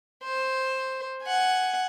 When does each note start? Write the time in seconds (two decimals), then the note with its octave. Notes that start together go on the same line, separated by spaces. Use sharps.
0.23 C5
1.23 F#5 G#5